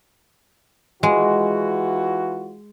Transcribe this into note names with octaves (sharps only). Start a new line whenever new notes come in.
E3 G#3 F4 F#4